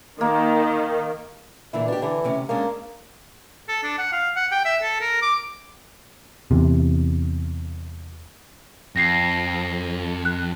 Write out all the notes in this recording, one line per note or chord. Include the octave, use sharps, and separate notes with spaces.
D#3 A#3
A#2 D3 E3 E4
B2 D4 G4
D3 E3
D2 C3 C#4
G#3 A#3 C#4 D4
A4
D4
F#5
F5
F#5
G5
E5
A4
A#4
D6
E2 C3
F2 A#6 C7
F#6